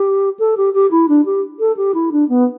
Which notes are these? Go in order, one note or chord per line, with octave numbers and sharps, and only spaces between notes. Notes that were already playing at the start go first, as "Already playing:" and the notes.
Already playing: G4
A4
G4
G4
E4
D4
G4
A4
G4
E4
D4
B3